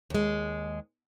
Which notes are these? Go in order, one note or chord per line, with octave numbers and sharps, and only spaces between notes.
D#2 G#3